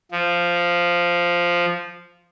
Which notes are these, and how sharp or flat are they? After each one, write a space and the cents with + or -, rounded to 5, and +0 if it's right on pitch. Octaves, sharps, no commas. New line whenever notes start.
F3 -5